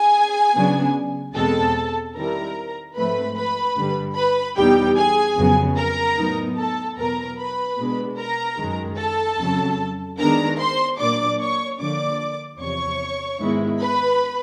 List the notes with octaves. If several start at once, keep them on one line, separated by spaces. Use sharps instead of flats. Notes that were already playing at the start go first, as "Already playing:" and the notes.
Already playing: G#4 G#5
C#3 F#3 B3 D4
E2 B2 G#3 C4 A4 A5
D#3 G3 C4 E4 A#4 A#5
G#2 F3 A3 C4 B4 B5
B4 B5
G2 D3 G3
B4 B5
E2 B2 G3 B3 D#4 G4 G5
G#4 G#5
F2 C#3 F#3 B3
A#4 A#5
A2 F#3 B3 D#4
A4 A5
E2 B2 F#3 B3 A#4 A#5
B4 B5
B2 G#3 B3 D4
A#4 A#5
F#2 D#3 G#3
A4 A5
F2 C#3 F#3
D#3 G#3 B3 D4 A#4 A#5
C5 C6
A#2 F#3 A#3 D4 D5 D6
C#5 C#6
D3 F3 A#3 D4 D5 D6
E2 C3 F3 C#5 C#6
G#2 D#3 G#3 B3 E4
B4 B5